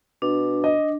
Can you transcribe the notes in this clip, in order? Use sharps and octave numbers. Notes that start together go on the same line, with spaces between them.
B2 D4
D#5